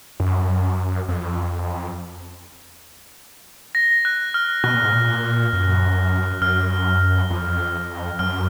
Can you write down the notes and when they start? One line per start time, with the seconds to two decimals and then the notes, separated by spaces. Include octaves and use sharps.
0.20 F#2
1.09 F2
3.75 A#6
4.05 F#6
4.34 F6
4.64 B2 F#6
4.74 A#2
4.83 G#2
4.93 A#2
5.53 F#2
6.42 F#2 F6
7.30 F2
8.19 F#2 F6